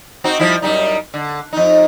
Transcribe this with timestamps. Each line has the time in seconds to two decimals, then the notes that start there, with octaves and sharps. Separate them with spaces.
0.24 C4 D#4 F#4
0.40 F3 G3 E4
0.62 F#2 G3 D#4
1.14 D3
1.53 F2 D#4